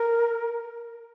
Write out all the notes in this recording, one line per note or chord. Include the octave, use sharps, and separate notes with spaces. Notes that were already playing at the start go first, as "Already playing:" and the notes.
Already playing: A#4